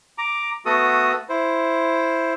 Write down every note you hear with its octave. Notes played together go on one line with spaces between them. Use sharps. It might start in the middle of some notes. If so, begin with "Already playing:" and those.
A#5 D6
A3 B3 F#4 A4 D#6
E4 C5